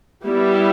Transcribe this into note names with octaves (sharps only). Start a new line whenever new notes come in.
G3 B3 E4 G4